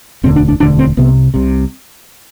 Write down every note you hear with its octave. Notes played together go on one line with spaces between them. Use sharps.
E1 D2 D3 C4
D4
D4
E1 D2 D3 D4
C4
C2 C3 B3
C2 C3